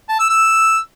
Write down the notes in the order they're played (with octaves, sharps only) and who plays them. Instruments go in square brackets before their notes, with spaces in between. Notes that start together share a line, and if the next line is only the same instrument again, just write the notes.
[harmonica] A5
E6
E6